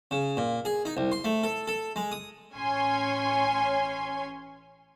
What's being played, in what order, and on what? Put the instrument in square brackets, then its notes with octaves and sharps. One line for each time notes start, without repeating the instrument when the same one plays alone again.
[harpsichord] C#3
A#2
G#4
D#4
C2
C6
A3
A4
A4
G#3
D#6
[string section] A1 C#4 C#5 G#5 C6